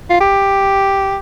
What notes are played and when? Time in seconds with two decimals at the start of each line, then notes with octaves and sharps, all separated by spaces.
0.10 F4
0.20 G4